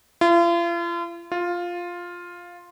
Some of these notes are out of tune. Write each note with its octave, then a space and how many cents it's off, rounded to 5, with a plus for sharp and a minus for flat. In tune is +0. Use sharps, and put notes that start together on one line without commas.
F4 -40
F4 +5